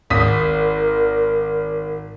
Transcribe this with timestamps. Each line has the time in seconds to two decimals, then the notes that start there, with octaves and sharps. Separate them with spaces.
0.10 G#1 A#4 D#6 B6